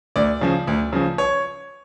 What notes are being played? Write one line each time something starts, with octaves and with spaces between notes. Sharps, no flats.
D2 D5
C#3 F3
D2
C#3 F3
C#5